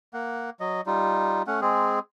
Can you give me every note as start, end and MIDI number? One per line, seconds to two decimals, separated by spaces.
0.14 0.50 58
0.14 0.50 78
0.60 0.81 54
0.60 0.81 75
0.86 1.42 55
0.86 1.42 63
0.86 1.42 65
1.47 1.60 57
1.47 1.60 61
1.47 1.60 78
1.61 1.99 56
1.61 1.99 60
1.61 1.99 68